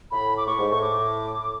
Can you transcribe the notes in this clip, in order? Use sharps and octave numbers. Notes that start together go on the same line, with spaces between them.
A2 B5
D6
A2 C#6
G#2
A2 C#6
D6